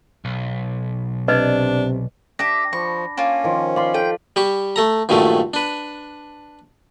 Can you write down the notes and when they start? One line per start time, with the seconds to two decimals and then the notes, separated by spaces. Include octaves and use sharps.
0.25 B1
1.28 C3 D4 B4 D5 D#5
2.39 D4 G4 E5 A#6
2.73 F3 B5 C#6
3.17 A#3 C#4 F4
3.44 D#3 F3
3.76 D5 F5 C6
3.94 A4 G5
4.36 G3 G4 C#6
4.76 A3 A4 A#5
5.09 G2 A#2 D#3 F#3 A3
5.54 D4 B4